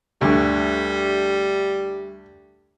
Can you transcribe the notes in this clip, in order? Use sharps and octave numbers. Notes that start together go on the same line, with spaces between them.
D2 G2 D3 G3